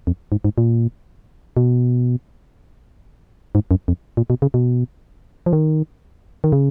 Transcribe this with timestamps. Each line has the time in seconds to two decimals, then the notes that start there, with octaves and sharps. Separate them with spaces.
0.07 F2
0.32 G#2
0.45 G#2
0.58 A#2
1.57 B2
3.55 G#2
3.71 F#2
3.88 F2
4.17 A#2
4.30 B2
4.42 C#3
4.54 B2
5.46 F3
5.53 D#3
6.44 D#3
6.52 C#3